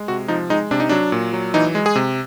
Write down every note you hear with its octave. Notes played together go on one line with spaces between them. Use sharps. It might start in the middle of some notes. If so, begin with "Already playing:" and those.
Already playing: G#3
C3 F#4
F3 D#4
G#3 D#4
C3 D4
D#4
F#3 D4
A#2
F#3
E3 D#4
G#3
G#4
C3